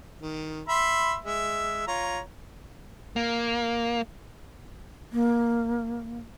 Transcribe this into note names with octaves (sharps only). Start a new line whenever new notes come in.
D#3
E5 B5 C6
G#3 E5
F4 C#5 A#5
A#3
A#3